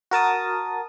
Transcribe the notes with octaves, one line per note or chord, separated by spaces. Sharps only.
F#4 A#4 A5 D#6